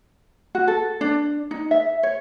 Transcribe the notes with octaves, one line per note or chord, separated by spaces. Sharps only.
F#4
A4
D4
D#4
E5
C#5